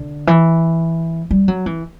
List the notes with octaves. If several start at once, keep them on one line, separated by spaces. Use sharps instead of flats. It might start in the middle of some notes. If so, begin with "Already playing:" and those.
Already playing: D3
E3
G3
F#3
E3